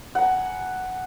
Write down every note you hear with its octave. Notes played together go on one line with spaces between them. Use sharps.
F#5 G#5 A#5